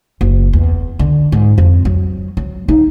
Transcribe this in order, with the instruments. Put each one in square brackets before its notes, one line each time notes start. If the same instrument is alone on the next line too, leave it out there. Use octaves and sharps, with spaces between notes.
[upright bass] F#1
E2
D3
G#2
F2
F#3
F#3
D#4